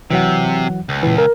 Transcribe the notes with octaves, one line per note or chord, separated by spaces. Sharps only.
C3 E3 F#3 F#5
C#2
A#2 E3
A#4